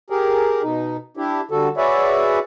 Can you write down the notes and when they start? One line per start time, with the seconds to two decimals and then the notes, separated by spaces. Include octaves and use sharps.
0.10 G4 G#4 A#4
0.63 B2 D#4
1.17 D4 E4 G4
1.51 D3 G3 F#4 A4
1.77 F#4 G#4 B4 C#5 D5 E5